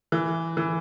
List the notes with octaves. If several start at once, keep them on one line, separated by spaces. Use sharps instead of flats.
E3
E3